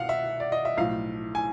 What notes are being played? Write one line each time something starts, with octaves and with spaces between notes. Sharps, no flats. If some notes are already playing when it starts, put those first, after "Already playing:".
Already playing: C2 B2 F5 F#5
E5
D5
D#5
E5
B1 A2 F3 F5
G#5